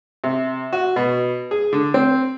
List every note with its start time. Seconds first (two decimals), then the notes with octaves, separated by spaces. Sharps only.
0.24 C3
0.73 F#4
0.96 B2
1.51 G#4
1.73 D3
1.94 C4